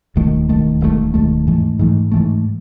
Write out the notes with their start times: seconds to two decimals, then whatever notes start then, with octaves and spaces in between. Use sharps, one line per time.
0.16 E1 D#2 D#3 A3
0.49 E1 D#2 D#3 A3
0.81 E1 D#2 D#3 A3
1.14 E1 D#2 D#3 A3
1.46 G#2 E3 A3
1.79 G#2 E3 A3
2.11 G#2 E3 A3